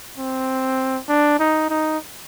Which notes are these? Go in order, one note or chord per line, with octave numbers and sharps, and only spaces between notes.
C4
D4
D#4
D#4